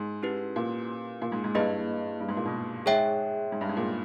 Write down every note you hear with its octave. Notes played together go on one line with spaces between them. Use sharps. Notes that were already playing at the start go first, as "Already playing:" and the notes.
Already playing: G#2
C#4 E4 G4 B4
A#2
A#2
G#2
G#2
G2 A#3 E4 G#4 B4 D#5
G2
G#2
A#2
B2
G#2 G#4 C#5 E5 G5
G#2
G2
G#2
A#2